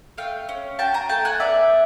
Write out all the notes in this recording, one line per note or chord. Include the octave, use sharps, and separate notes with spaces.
A3 F5 G5
C#4
F#4 G5 A5
G#5 A#5
A3 G5 A5
F#5 G#5
B3 D5 E5